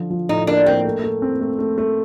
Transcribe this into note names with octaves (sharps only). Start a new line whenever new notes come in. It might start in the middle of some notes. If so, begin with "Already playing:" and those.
Already playing: D3 F3 F4
F3
A2 D#4
A#3 D4
A#3 C4
A3
A3
C4
A3
A3
A3